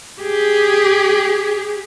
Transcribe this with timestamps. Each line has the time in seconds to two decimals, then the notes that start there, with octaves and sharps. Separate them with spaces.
0.21 G4 G#4